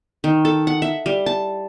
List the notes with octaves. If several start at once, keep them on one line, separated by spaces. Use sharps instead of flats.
D#3
A4
F#5
E5
G3
A5